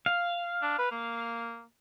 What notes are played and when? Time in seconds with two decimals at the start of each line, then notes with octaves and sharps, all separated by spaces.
0.06 F5
0.62 D4
0.79 B4
0.91 A#3